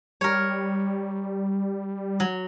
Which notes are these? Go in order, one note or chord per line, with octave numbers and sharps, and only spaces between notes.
G3 A#4 C#5
F#3